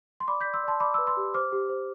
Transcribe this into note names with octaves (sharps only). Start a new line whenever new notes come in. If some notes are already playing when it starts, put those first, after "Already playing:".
C6
D5 B5 D6
D5 G6 B6
C6 E6
D5 A5 C6
D5 B5 D6
C6 E6
B4
C6 E6
G4
C5 D6 F6
G4
C5